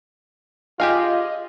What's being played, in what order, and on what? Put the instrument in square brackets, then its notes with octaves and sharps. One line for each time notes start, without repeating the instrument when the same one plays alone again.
[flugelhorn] F4 [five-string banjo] G4 G#4 F5 [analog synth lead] D#5